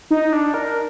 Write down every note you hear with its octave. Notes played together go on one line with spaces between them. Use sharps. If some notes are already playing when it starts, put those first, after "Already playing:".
D#4
D4
A#4